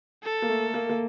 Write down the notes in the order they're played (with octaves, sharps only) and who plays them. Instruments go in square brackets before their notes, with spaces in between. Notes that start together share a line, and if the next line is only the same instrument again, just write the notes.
[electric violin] A4
[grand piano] A#3
A3
A#3
A#3